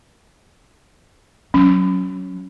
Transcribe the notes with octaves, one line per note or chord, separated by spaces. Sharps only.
F#3 C#4